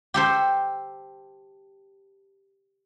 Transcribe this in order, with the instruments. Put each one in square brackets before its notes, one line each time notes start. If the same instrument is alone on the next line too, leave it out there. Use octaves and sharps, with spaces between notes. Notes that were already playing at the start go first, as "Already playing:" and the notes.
[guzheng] G4 A4 C5